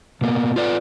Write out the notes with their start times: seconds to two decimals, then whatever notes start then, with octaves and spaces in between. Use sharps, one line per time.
0.21 B2 A#3 B3
0.56 F4 B4 D5